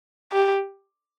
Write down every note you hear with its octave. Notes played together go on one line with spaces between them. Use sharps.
G4